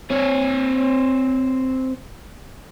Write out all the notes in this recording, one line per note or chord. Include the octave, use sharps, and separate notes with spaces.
C4 C#5